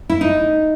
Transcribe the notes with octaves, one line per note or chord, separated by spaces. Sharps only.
E4
D#4